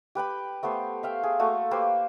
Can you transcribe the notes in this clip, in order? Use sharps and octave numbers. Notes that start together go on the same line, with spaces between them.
G4 B4 G5 B5
A3 B3 G4 C5
E5 F5 G5
G#4
A3 A#3 F#4 A4
A#3 G4 B4 C5